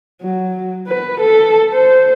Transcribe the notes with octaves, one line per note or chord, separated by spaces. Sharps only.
F#3
B4
A4
C5